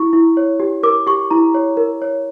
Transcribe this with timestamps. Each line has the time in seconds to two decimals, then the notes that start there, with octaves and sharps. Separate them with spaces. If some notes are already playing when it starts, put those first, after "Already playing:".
Already playing: E4 C#6
0.13 E4
0.37 C#5
0.60 G4
0.83 A#4 D6
1.07 G4 C#6
1.30 E4 A#5
1.54 C#5
1.77 A#4
2.02 C#5